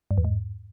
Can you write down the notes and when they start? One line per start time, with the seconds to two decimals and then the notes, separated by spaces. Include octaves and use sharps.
0.11 G2
0.18 E2
0.25 G#2